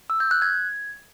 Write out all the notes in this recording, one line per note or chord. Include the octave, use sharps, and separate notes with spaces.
E6
G6
F#6
G#6